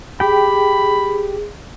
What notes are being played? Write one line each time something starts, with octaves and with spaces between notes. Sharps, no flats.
G4 G#4 G5 B5